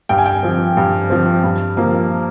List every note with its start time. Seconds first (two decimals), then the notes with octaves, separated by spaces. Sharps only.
0.09 G2 G5
0.18 G#5
0.26 G5
0.43 F3 C4
0.77 G2
1.10 F3 C4
1.44 G2
1.77 F3 A#3